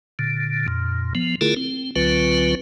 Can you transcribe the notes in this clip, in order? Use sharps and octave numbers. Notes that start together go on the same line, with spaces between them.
A#2 D3
F2 A#2
F3 B3
D3 A3 E4 F4 G#4 A#4
C4
C#2 D3 F#3 C4 F4 B4